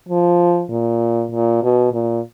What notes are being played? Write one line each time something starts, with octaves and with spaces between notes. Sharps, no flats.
F3
A#2
A#2
B2
A#2